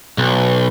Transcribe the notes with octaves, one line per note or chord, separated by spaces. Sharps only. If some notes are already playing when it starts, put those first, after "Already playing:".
B1